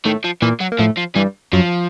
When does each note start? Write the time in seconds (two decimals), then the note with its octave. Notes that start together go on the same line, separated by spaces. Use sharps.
0.05 A2 D#3 A3
0.24 F3
0.42 A#2 E3 A#3
0.60 F#3
0.72 A#3
0.79 A2 F3 A3
0.97 F3
1.15 G2 E3 G3
1.53 F#2 F3 F#3